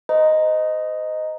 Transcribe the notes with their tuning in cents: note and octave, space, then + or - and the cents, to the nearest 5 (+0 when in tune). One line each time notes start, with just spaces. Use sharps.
C5 -35 D#5 +0 A#5 +0